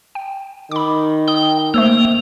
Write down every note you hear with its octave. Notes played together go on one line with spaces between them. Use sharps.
G5
D#3 B5 D6
G5 D#6
A3 A#3 C5 E6